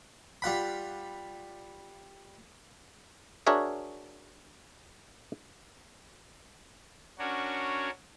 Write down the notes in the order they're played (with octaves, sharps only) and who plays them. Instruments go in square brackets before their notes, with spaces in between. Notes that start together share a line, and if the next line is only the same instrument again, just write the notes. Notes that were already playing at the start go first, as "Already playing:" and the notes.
[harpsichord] G3 F4 F#5 B5
[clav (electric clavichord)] D4 F#4 G#4 A#4 C#5 E5
[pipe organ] C#4 D4 F#4 A#4 C#5